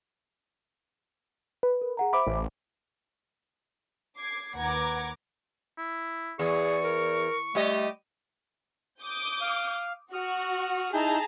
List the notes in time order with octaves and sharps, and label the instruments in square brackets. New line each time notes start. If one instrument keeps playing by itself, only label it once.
[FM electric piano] B4
[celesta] A#4
G#4 F#5 A#5
[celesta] C5 E5 [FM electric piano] B5 D6
[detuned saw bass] A1
[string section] D6 G#6 C7
D#2 B4 F#5 A#5 D6 G#6
[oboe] E4
[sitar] E2 [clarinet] G#4 [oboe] C#6
[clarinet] A#4
[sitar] G3 G4 D#5 [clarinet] A3
[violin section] D6 D#6 G6
[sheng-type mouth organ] F5
[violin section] F#4 [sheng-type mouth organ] D#6 F6
[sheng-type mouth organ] D#4 E4 G6 [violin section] G#4 A5 A#5